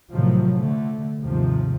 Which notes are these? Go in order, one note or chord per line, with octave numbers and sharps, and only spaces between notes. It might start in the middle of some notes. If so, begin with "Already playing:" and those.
A2 C3 D#3 F3 F#3
D3 A3
D#2 G#2 C3 F3